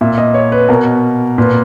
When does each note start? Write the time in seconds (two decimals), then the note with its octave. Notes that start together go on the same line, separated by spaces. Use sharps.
0.01 A#2 E5
0.18 D#5
0.34 C#5
0.52 B4
0.69 B2 A#4
1.38 A#2 B4